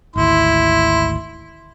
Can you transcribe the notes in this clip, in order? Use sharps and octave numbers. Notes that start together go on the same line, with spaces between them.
G#1 D2 E4 C6